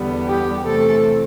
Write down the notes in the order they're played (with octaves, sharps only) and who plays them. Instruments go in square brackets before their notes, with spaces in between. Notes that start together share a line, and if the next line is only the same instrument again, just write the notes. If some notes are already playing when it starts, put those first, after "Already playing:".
Already playing: [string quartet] E2 D3 G3 B3
G4
C3 E3 A3 C4 A4